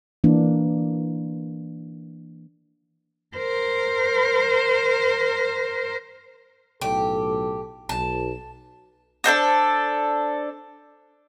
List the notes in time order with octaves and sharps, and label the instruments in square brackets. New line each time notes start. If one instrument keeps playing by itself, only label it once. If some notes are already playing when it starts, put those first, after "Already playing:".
[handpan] E3 A#3 D4
[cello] A#4 C5
[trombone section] B1 A2 A4 [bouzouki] G4
[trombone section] B1 [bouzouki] A5
[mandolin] D4 A4 C5 D#5